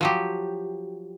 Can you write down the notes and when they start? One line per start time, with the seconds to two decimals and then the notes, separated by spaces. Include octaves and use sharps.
0.01 F3 F#3 G4